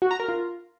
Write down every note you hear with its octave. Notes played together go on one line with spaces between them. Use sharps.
F#4
A#5
A#4
F4